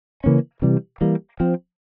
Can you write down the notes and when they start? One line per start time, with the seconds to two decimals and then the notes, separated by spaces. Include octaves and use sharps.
0.24 C#3 E3 A#3 C#4
0.62 C3 E3 G3
1.01 E3 G3 A#3
1.40 F3 C4